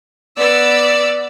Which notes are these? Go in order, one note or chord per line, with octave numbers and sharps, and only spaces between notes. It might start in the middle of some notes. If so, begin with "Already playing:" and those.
B3 D5 E6